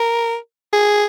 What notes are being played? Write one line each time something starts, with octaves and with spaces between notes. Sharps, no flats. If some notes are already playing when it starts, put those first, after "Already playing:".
Already playing: A#4
G#4